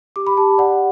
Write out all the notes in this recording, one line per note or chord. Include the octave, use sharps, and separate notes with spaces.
G4 D6
B5
G4 A5
D5 F#5